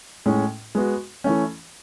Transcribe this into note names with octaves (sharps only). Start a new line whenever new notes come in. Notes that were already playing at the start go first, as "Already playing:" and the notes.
A2 G#3 C#4
G#3 B3 F#4
E3 A3 C#4